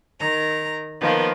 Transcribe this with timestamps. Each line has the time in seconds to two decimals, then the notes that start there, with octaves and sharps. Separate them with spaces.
0.19 D#3 A#5
1.00 D#3 F3 A#3 B3